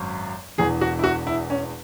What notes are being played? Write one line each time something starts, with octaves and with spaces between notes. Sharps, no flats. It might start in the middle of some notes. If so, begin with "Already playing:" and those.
Already playing: G#1 F#2
E1 E2 E3 G#4
F#4
E4
F#4
E4
C#4